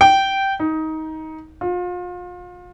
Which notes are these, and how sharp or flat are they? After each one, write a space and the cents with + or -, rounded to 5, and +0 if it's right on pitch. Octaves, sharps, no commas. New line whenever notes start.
G5 -10
D#4 +20
F4 +35